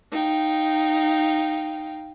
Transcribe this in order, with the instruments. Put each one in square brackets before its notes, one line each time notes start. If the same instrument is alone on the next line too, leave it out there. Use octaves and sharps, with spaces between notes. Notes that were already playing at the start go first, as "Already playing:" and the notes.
[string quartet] D#4 F5 G5